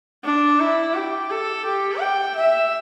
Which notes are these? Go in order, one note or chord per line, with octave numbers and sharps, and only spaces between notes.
D4
E4
G4
A4
G4
G5
E5